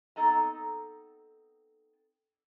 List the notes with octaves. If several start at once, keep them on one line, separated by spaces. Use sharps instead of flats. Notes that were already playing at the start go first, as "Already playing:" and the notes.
B3 C4 D#4 A4 D#5 A#5